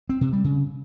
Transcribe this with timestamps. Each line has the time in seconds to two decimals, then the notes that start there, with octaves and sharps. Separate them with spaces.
0.09 C4
0.21 C3
0.33 G3
0.44 C#3